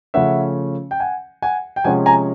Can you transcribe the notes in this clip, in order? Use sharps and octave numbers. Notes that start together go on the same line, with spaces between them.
C#3 F3 A3 C#4 E5 F#5
G5
F#5 G#5
F#5 G#5
G5
C3 F3 G#3 C#4 F#5 G#5
G#5 A#5